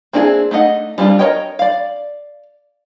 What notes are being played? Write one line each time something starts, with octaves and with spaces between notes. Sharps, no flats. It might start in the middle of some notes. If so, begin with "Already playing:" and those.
A#3 C4 D4 E4 G#4
A3 D4 D#4 D#5 F#5
G3 C4 D4 F4
A#4 C5 C#5 D#5 G5
D5 F5